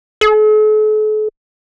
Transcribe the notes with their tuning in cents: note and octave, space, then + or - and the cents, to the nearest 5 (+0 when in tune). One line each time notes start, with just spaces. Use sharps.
A4 -45